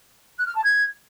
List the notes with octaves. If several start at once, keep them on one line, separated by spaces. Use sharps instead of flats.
F#6
F6
A5
G#6